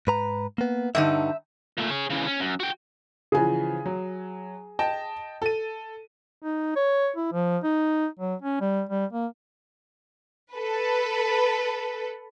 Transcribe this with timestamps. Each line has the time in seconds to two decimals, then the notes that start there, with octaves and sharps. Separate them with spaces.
0.07 G#2 B4 A#5
0.58 A#3 B3
0.95 G2 D3 D#4 E5
1.78 A#2 A3
1.90 G#4 C#5
2.10 C#3 E3
2.26 C#4
2.40 F#2
2.60 F#4 G5
3.32 C#3 E3 F3 G#4 G#5
3.86 F#3
4.79 D#5 G5 A5
5.42 A4 D#7
6.43 D#4
6.76 C#5
7.16 E4
7.32 F3
7.63 D#4
8.19 F#3
8.42 C#4
8.60 G3
8.89 G3
9.13 A#3
10.53 A4 B4